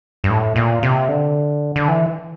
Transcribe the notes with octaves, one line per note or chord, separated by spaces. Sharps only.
G2
A2
A#2
C3
D3
D3
E3